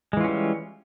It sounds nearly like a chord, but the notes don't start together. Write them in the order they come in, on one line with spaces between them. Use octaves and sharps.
G#3 E3 F4 C#4 G3